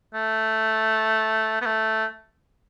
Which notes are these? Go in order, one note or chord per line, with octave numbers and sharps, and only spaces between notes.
A3
B3
A3